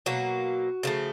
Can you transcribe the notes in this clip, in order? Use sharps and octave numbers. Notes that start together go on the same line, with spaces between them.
B2 F#3 A#3 F#4
C#3 F3 A3